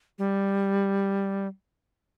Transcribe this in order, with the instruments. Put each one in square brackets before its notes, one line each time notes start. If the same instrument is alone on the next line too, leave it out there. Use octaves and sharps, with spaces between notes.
[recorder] G3